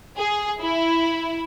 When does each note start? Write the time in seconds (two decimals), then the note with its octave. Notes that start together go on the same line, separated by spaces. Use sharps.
0.17 G#4
0.62 E4